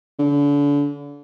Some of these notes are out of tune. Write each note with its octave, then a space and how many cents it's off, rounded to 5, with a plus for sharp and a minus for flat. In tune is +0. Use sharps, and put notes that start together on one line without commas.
D3 -35